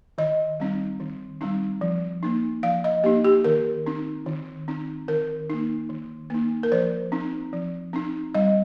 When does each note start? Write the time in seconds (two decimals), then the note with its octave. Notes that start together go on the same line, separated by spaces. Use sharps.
0.18 D#3 D#5
0.60 G3 C4 D#4
1.00 D#3
1.41 G3 C4 D#4
1.81 F3
2.23 A#3 D#4
2.63 F3 F5
2.84 D#5
3.04 A#3 D#4 G4
3.24 G4
3.45 D#3 A#4
3.86 C4 D#4
4.26 D#3
4.68 C4 D#4
5.08 D#3 A#4
5.50 A#3 D#4
5.89 D#3
6.30 A#3 D#4
6.63 A#4
6.72 F3 C5
7.12 C4 D#4
7.53 F3
7.93 C4 D#4
8.35 G3 D#5